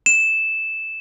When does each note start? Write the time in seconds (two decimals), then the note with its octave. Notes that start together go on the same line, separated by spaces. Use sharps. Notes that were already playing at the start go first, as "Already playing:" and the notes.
0.06 E7